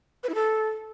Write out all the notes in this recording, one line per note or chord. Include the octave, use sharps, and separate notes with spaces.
B4
E4
A4